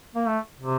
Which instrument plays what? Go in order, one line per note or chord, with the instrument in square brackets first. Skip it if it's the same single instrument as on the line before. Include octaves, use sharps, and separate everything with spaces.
[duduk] A#3
A3
C3